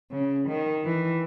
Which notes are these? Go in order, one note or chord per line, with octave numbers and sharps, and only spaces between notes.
C#3
D#3
E3